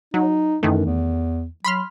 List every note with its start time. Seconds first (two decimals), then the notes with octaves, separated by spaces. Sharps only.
0.14 F#3 D#4
0.63 F#2 D#3 E3 A3
0.86 E2
1.65 F#3 B5 C6 F6